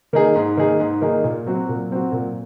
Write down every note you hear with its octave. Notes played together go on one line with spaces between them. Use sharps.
D#3 A#3 D#4 G#4
G#2
D#3 A#3 D#4 G#4
G#2
D#3 A#3 D#4 G#4
A#2
F#3 C4 F#4
A#2
F#3 C4 F#4
A#2